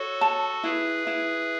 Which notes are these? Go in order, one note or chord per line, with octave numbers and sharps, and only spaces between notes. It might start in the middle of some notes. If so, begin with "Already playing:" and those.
Already playing: F#4 A4 C#5
A5
E4 G#4 B4
E4